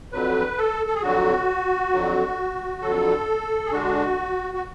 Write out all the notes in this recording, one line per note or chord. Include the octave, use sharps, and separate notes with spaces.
F2 D3 F#3 B4
A4
A4
G#4
F2 D3 F#3 F#4
F2 D3 F#3
F2 D3 F#3 A4
G#4
D3 G#3 D4 F#4
F#4